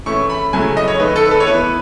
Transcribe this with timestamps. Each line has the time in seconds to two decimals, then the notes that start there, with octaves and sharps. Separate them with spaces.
0.06 E3 A3 C#4 E4 C#6
0.30 B5
0.53 C#3 F#3 A3 E4 G#5
0.77 D#5
0.88 C#5
0.99 D#3 A3 D#4 B4
1.16 A4
1.26 B4
1.31 A4
1.40 C#5
1.47 E3 B3 E4 B4